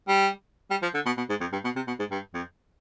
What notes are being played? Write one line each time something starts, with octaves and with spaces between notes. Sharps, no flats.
G3
G3
F3
D3
B2
B2
G#2
F2
G2
B2
C3
B2
G#2
G2
F2